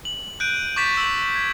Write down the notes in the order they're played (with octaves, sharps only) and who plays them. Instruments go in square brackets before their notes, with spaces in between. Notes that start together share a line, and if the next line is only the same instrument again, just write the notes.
[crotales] F#7
F#6 G6 D7 D#7
C#6 D6 G6 A6 B6 E7
E6 F#7
G#6